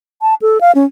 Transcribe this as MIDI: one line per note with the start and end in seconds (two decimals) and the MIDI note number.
0.22 0.34 81
0.41 0.60 69
0.60 0.72 77
0.75 0.85 61